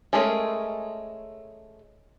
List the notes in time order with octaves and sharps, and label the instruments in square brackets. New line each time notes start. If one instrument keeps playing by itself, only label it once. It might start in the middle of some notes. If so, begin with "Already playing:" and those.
[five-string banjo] G#3 A3 C#4 G#4 A#4